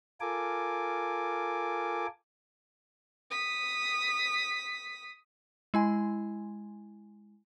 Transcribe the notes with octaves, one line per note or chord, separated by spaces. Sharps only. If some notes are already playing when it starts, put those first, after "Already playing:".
F4 A4 A#4 G#5 D6
D#6 B6
G#3 E4 G#5